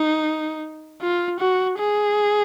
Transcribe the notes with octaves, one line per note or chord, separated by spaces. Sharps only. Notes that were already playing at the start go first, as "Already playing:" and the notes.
Already playing: D#4
F4
F#4
G#4